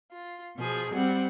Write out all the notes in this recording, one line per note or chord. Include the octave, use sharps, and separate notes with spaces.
F4
B2 F3 G#4
G3 C4 F#5